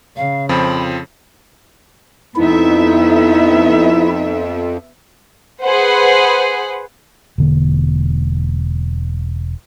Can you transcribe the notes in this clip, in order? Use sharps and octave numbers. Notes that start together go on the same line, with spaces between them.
C#3 F5
F2 F3 C4 B5
F2 B3 D#4 E4 E5
G#4 B4 C5 F#5
E1 D3 A#3